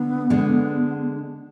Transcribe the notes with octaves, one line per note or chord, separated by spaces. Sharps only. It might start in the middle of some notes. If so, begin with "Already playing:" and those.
Already playing: D3 B3 D4
D3 G#3 D4